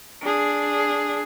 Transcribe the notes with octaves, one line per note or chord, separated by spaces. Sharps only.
D4 G#4